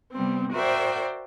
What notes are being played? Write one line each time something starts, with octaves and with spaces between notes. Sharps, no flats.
C3 G3 B3 C4
F#4 A#4 C5 D5 E5 G5